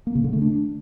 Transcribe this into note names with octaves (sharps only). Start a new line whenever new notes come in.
A#3
C#3
D3
A3
D4